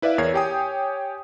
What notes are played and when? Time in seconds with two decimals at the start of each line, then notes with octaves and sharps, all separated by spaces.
0.02 E4 B4 D5 E5 F5
0.18 E2 A#4 C#5 G#6 C7
0.34 G4 C#5 G5 G#5 D#6